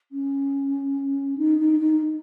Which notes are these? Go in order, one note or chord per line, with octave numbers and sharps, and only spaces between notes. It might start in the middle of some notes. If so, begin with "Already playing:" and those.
C#4
D#4
D#4
D#4